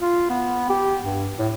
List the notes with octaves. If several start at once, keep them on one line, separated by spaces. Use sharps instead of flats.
F4
B3
G4
G2
A2